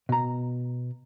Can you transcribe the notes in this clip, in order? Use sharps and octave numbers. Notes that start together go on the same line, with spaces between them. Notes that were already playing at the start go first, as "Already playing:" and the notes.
B2 A#5